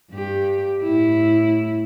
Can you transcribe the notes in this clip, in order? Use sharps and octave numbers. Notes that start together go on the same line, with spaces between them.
G2 G4
A2 E4